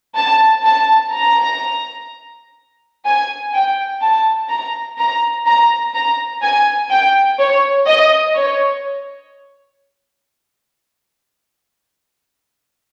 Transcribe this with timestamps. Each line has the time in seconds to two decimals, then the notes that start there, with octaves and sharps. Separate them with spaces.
0.16 A5
0.64 A5
1.12 A#5
3.05 G#5
3.53 G5
4.02 A5
4.50 A#5
4.98 A#5
5.46 A#5
5.94 A#5
6.42 G#5
6.90 G5
7.39 C#5
7.87 D#5
8.35 C#5